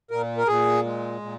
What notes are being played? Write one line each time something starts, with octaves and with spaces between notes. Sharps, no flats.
A#2 A#4
A#4
A#2 G#4
G#3
A#2